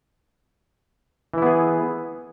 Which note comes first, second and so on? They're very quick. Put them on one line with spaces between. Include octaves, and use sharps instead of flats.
E3 E4 B3 G#4